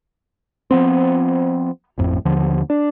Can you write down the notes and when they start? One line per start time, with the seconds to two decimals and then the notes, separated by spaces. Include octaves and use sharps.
0.71 F3 B3 C4
1.98 G#1 F2 A2
2.25 D#2 D3 F3
2.70 D4